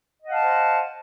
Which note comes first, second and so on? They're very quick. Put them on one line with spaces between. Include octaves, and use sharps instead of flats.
D#5 F#5 F5 A5 C5